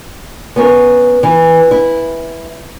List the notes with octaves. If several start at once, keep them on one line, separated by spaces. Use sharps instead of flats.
B3 C#4 A#4
E3
E4